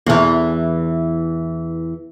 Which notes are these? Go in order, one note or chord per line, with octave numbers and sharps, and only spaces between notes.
E2 E3